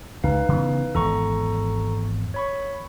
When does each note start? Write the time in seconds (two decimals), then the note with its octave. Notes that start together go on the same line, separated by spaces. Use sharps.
0.24 C#2 D#4 B4 F5
0.49 C#3 E3 B3
0.95 G#1 E2 A4 A#5 C#6
2.34 C#5 B5 C#6